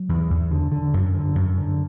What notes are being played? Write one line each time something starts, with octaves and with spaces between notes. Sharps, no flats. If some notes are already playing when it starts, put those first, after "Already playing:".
Already playing: F#3
E2
E2
D3
D3
F#2
D3
F#2
D3